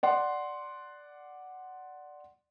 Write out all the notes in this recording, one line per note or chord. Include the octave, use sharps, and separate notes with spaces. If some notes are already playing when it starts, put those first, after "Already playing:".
D5 F#5 C6